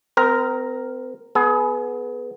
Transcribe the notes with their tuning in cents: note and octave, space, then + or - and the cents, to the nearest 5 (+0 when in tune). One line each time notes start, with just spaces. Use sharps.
C4 -40 A#4 +0
B3 +0 G#4 +30